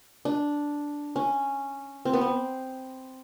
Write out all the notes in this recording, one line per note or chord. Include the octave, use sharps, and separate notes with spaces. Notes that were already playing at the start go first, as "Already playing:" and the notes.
D4
C#4
C4
B3
C4